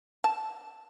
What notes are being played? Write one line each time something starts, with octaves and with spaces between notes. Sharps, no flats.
A5